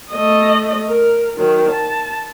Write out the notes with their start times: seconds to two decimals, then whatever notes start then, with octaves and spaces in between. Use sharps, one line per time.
0.11 A3 D#5
0.87 A#4
1.37 D#3 F#3
1.69 A5